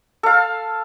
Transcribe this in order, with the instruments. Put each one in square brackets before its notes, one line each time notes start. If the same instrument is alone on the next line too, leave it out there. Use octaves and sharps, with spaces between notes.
[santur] A4 F5